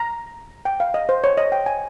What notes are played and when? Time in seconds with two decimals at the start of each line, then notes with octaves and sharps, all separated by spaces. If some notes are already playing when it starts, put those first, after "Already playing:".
Already playing: A#5
0.65 G5
0.80 F5
0.94 D#5
1.09 C5
1.24 C#5
1.37 D#5
1.52 G5
1.66 G#5